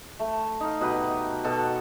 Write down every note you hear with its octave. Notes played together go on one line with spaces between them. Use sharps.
A3
D#4 F5
B2 D#4 G4 B4
B2 A4 F#5